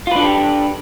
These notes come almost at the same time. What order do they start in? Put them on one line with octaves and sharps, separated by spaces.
F4 B4 D4 A4 G4